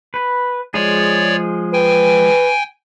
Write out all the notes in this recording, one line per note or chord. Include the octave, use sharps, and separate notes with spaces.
B4
F3 G#3 G#4 C#5 D5
B4 G5 G#5